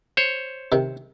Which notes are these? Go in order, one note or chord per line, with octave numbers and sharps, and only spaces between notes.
C5 C#5
C3 D#3